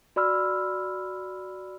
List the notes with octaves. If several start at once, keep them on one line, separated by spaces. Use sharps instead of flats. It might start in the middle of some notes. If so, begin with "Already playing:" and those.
F#4 D5 B5 E6 F6